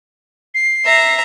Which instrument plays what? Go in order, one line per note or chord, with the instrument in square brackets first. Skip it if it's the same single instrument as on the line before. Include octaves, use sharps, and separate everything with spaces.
[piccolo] C7
[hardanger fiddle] E5 A#5